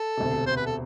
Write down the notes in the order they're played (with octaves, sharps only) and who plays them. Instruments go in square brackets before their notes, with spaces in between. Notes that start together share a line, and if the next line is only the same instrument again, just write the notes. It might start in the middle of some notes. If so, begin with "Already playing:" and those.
Already playing: [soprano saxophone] A4
[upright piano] E1 D2 C3
[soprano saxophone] C5
B4
A4